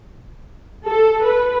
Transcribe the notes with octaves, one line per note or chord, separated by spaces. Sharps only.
A4
B4